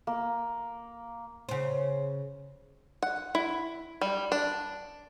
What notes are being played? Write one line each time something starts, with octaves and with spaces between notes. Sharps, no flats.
A#3
C#3 C5
F#5
E4
G3
D4